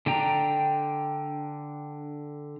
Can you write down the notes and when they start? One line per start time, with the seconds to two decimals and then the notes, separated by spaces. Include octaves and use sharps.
0.06 D3 D4 G5 A#5